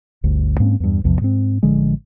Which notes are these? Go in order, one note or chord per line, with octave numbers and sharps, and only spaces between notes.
G1 D2
G#2 A#3 C4 C#4
E2 G2
A#1 E2 C3 F3
G#2 C4
A1 D3 F3 G#3